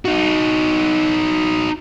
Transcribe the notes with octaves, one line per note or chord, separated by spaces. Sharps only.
D#4 F#4